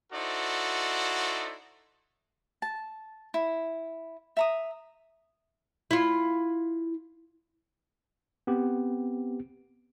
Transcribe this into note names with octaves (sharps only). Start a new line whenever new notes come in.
D#4 E4 F#4 A4 C5 D5
A5
E4
E5 A#5 D#6
E4 F4
B3 C4 G4